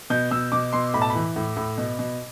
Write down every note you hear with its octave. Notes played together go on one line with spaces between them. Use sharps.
B2 G6
B2 E6
B2 D6
B2 C6
A2 B5
A5
B5
E3
A2
A2
B2
B2